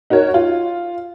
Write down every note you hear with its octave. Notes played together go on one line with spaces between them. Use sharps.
D#4 F#4 A#4 C#5
F4